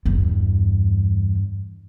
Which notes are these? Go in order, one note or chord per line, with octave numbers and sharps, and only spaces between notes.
E2 G2